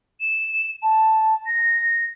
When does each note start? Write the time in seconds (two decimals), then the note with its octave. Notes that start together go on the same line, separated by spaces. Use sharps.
0.21 E7
0.83 A5
1.46 A#6